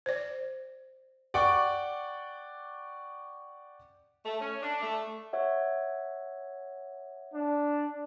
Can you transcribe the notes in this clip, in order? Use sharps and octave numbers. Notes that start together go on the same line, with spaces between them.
C5 D5
D5 F#5 G5 C#6 D6
A3
C#4
D4
A3
C#5 E5 F#5
D4